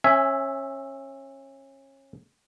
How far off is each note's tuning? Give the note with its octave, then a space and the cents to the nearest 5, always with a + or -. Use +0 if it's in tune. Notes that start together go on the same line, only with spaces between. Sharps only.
C#4 -30 E5 +0 G#5 +0